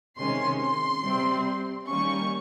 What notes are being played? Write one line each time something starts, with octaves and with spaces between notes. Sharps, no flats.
C3 D#3 G#3 C#4 C6
C6
C3 G3 C4
D#3 G3 A#3 C#4 C#6